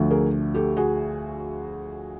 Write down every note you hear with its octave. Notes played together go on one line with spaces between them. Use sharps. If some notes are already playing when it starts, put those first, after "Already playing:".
Already playing: D2 D3 F3 A3
G#4 A#4
G4 A4
F#4 G#4